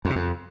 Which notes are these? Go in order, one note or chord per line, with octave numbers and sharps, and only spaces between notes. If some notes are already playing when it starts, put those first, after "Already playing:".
F2
C3
F2